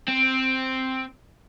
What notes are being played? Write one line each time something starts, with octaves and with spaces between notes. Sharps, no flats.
C4